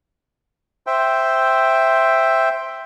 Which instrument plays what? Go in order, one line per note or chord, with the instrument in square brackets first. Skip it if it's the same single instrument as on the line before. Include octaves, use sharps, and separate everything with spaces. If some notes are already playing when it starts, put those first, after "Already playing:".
[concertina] C5 E5 G5